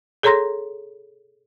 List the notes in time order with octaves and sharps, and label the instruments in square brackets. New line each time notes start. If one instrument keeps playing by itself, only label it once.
[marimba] G#4 A4 C#5 A#5 C6 A#6